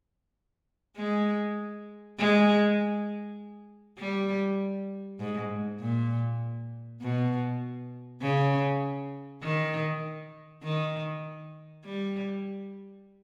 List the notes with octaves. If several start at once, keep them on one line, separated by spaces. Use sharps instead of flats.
G#3
G#3
G3
G#2
A#2
B2
C#3
D#3
D#3
G3